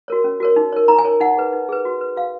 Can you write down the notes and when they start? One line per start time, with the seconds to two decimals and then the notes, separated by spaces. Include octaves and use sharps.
0.08 F#4 A#4 C#5
0.24 C#4
0.40 F#4 A#4 C#5
0.56 D#4
0.73 A#4 C#5
0.88 D#4 A#5
0.98 G#5
1.04 A#4 C#5
1.20 D#4 F#5
1.37 G#4 B4
1.53 D#4
1.69 G#4 B4
1.85 F#4
2.01 B4
2.16 F#4 F5